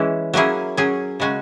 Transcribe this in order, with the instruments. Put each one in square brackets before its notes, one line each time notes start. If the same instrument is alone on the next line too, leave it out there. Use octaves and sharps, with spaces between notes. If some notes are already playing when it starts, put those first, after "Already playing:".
Already playing: [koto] E3 G#3 C#4 E4
F#3 A#3 C#4 E4 G#4
F#3 C#4 G#4
C#3 G#3 C#4 F#4